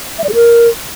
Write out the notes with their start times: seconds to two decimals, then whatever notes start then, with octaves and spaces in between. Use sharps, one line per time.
0.19 E5
0.24 D5
0.29 G#4
0.34 A#4